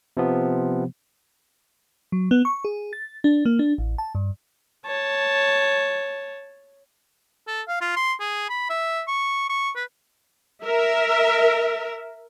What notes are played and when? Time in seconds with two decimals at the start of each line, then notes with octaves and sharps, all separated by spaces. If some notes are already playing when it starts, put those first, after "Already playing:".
0.17 C3 F3 B3
2.12 F#3
2.31 B3
2.45 C#6
2.65 G#4
2.93 A6
3.24 D4
3.45 A#3
3.59 D4
3.78 A1
3.98 A5
4.15 G2
4.86 C#5 A5
7.47 A4
7.68 F5
7.81 F4
7.96 C6
8.20 G#4
8.49 B5
8.70 E5
9.07 C#6
9.49 C#6
9.76 B4
10.65 A#4 E5